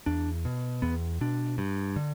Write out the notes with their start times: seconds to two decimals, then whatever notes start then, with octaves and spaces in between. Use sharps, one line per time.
0.06 E2 D4
0.45 B2
0.82 E2 B3
1.21 B2 D4
1.58 G2
1.96 D3